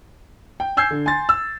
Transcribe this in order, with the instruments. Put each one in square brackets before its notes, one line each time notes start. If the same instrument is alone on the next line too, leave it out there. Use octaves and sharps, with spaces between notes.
[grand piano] G5
G#5 E6 G6 G#6 C7
D3
G#5 C6 A6
E6